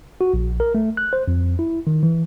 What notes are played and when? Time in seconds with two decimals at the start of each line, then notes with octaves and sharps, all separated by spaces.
0.21 F#4
0.34 A#1
0.60 A#4
0.75 A3
0.97 F#6
1.13 C5
1.28 F2
1.59 E4
1.87 D#3
2.03 E3